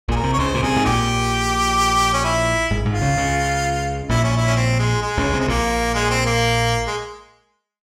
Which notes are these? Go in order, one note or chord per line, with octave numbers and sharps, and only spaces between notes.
A#1 A#2 G#4
A#4
C2 C3
C#5
C#2 C#3 C5
A#2
C2 C3 G#4
G#2
A#1 A#2 G4
C#4
E4
G#1 G#2
G#1 G#2
F4
C#2 C#3
C#2 C#3
A#1 A#2 E4
C#4
E4
C#4
C4
G#3
G#3
C#2 C#3
C2 C3
G#3
A#1 A#2 A#3
G#3
C4
A#3
G#3